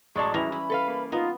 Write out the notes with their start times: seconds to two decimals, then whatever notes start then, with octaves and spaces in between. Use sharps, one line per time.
0.16 A1 F#3 G#3 D5 A5 C#6
0.34 E3 G3 C#4 E4 A#6 F7
0.52 E4 B5
0.70 A4 B4 F5
0.88 A#3
1.12 B3 D#4 F4